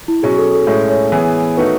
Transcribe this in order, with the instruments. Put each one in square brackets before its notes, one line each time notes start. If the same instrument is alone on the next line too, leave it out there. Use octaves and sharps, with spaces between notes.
[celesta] E4
[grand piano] B2 F#3 C#4 [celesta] G#4
[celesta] A4
A4
[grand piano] A2 G#3 C#4 [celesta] C#5
[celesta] C#5
[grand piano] E3 B3 E4 G#4
[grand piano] D#3 A3 D#4 F#4 [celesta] B4